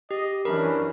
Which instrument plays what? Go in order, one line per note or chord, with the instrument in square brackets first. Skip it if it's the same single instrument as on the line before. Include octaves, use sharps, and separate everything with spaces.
[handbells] G4 [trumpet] D#5
[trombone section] F#2 C#4 D4 [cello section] E3 [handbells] A#4 [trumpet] B5